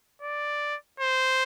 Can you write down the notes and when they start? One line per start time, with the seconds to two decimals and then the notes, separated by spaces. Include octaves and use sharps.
0.22 D5
1.00 C5